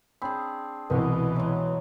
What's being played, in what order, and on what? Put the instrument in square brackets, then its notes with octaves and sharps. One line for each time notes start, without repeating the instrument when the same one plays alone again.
[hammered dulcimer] C4 D4 G#4 [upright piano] B5
[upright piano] C2 B4 [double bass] B2 E3 [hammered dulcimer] D#5 C#6
[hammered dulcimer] F#3 G#3